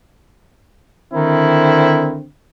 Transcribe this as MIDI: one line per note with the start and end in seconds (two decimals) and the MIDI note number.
1.13 2.26 50
1.13 2.21 51
1.13 2.26 60
1.13 2.16 64